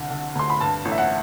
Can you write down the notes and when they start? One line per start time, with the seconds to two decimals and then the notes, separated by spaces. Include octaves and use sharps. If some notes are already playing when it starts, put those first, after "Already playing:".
Already playing: C2 D3
0.10 D3
0.35 D2 C6
0.50 B5
0.60 G2 A5
0.85 A1
0.91 E5
0.98 F#5